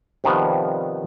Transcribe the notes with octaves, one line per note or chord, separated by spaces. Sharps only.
C3 D#3 F3 G3 B3